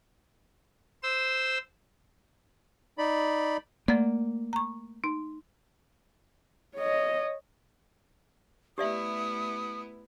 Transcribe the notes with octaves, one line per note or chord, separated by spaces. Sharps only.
C5 E6
D#4 D5 B5
A3 A#3 D5
A#5 C#6
D#4
C#5 D#5
A3 B3 E4 G4 D5 E5 D#6